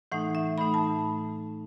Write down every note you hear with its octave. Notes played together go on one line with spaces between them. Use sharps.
A2 E3 A3 D#4 F#5
E5
A2 E3 A3 D#4 B5
A5